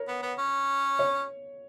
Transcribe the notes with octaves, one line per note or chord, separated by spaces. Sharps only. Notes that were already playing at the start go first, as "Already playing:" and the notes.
Already playing: A#4 C#5
B3
B3
C#4
C#5